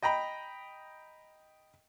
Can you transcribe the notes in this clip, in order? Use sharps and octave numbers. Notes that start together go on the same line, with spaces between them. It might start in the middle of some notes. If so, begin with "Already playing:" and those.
D#5 G5 A#5 B5